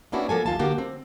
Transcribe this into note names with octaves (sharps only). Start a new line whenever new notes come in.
A#3 B3 C#4 D4 E4 F#4
F3 A#3 A4 G#5
D#2 F4 A5
D3 A#3 F#4 G4 A#4
C4